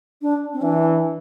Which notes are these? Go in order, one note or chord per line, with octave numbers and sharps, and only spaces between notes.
D4
C4
E3 D4